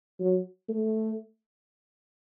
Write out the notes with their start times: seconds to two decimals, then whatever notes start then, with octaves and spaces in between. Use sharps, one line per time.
0.20 F#3
0.68 A3